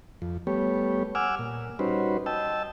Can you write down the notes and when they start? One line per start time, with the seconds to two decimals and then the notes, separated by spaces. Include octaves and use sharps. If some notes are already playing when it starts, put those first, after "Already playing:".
0.22 F2
0.47 G3 A3 B3 G4 C#5
1.15 F#5 G#5 D6 E6 F6
1.39 A#2
1.79 G3 C#4 D#4 F#4 B4 C5
2.26 D#5 G5 A5 E6